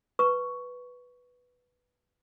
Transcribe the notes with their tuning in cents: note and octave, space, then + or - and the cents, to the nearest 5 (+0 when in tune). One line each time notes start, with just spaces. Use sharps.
B4 +0 C#6 +5